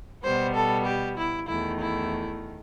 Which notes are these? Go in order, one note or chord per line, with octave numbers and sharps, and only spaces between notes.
B2 G3 B3 C5
A4
G4
E4
E2 D#3 A3 E4
E4